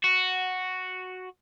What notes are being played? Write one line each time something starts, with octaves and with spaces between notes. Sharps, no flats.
F#4